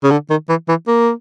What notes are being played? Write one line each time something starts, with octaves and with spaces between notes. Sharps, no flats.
C#3
D3
D#3
E3
E3
A#3